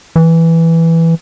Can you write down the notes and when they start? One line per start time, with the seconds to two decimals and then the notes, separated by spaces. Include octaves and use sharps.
0.16 E3